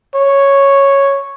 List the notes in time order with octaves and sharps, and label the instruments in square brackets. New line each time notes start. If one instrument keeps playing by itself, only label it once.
[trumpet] C#5